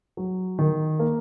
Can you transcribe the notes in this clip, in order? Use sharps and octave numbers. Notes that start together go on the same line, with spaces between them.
F#3
D#3
A#3